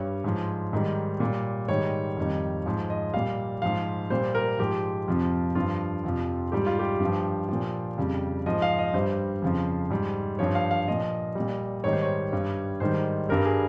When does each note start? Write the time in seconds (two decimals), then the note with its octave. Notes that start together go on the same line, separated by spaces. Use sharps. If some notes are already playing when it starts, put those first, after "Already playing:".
Already playing: G2 G3 C#5
0.24 G#2 F3
0.73 G#2 D#3 G3
1.20 A#2
1.25 G3
1.68 G#2 D#3 G3 C#5
2.17 F2 D#3 G3
2.66 G#2 F3
2.90 D#5
3.14 A#2 G3 F5
3.62 G#2 F3 F5
4.10 A#2 G3 C5
4.35 A#4
4.59 G#2 F3 G4
5.08 F2 C3 F3
5.55 G2 F3 F4
6.04 F2 C3 F3
6.52 G#2 G3 G4
6.66 F4
6.79 G4
7.00 G2 F3
7.49 A#2 F3
7.98 F2 C#3 G3
8.46 G#2 F3 D#5
8.62 F5
8.79 D#5
8.94 G2 G3 C5
9.42 F2 C#3 F3
9.90 G#2 G3
10.39 G2 F3 C#5
10.55 F5
10.71 F5
10.88 A#2 F3 D#5
11.35 A#2 G3
11.84 G#2 D#3 G3 C#5
11.93 C5
12.02 C#5
12.32 G2 G3
12.80 G#2 D#3 G3 C5
13.29 G2 G3 A#4
13.46 G#4